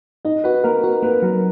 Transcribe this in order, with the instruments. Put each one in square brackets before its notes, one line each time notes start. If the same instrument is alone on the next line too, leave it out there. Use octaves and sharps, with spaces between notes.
[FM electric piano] D#4 [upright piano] D#5
[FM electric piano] F#4 [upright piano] B4
[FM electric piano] A#3 [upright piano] A#4
[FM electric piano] F#4 [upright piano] B4
[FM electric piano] A#3 [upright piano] B4
[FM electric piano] F#3 [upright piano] A#4